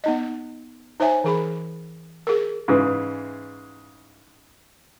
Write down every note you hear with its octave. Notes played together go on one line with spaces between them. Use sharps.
B3 D#4 D#5
D#4 C5 C#5 E5 G#5
E3 G#4 B5
G#4 A#4
G#2 C#3 E3